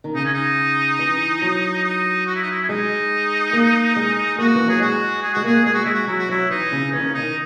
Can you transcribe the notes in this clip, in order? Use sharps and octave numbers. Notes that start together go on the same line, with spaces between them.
D#3
C#3 D#4
C#4
D#4
E3
F#3
D#4
F#4
E4
D#4
E4
C#4
G#3 D#4
A#3
G#3
A#3 F#4
E3
F#3 G#4
G#3 F#4
G#4
G#3 F#4
A#3 G#4
G#3 G#4
F#4
G#3 E4
F#4
F#3 E4
F#4
F#3 E4
E3 D#4
C#3
E3 C#4
D#3
C#3
D#3 D#4